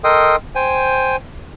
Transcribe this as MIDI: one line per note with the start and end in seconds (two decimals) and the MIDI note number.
0.04 0.36 69
0.04 0.36 70
0.04 0.36 75
0.04 0.36 79
0.04 0.36 84
0.04 0.36 87
0.55 1.16 72
0.55 1.16 79
0.55 1.16 80